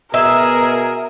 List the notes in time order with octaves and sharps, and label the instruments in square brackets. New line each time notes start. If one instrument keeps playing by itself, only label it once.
[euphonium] B2 [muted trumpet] G#4 [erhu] A#4 [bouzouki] E5